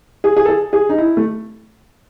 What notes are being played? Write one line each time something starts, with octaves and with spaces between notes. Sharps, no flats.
G#4
G#4
A4
G#4
G#4
D#4
E4
A3